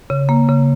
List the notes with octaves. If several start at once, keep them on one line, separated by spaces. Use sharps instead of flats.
C#3
A#3
C#3